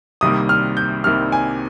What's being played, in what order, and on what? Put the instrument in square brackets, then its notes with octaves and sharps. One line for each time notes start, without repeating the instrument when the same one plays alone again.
[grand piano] C2 C3 D#3 G3 A#3 D#6
F6
G6
C2 C3 D#3 G3 A#3 F6
G#5